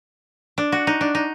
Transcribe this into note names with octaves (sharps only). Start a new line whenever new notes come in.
D4
F#4
D#4
D4
D#4